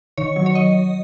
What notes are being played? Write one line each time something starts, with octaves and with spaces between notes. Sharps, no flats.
D#3 C#5
F#3
C#5
D#5